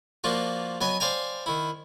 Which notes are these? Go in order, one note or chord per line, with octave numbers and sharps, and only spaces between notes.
F3 A#3 D4 F4 F#4
F#3 B3 D#5 G#5 D#6
C5 D5 F5 G5 G#5 A#5
D#3 E4